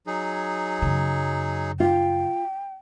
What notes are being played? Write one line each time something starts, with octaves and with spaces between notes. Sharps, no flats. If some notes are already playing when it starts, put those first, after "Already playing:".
F#3 D#4 G#4
F#2 C#3
F4 G5